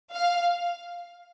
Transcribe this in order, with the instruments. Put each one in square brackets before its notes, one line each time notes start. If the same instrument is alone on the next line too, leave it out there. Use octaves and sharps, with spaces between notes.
[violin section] F5